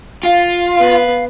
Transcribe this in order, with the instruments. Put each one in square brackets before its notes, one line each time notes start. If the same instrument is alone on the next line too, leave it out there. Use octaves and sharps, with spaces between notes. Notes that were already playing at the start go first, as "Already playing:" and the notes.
[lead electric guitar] F4 [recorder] F5
[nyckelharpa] B3 B4